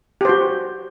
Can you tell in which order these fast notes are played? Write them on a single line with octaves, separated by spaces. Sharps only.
G4 C5 F#4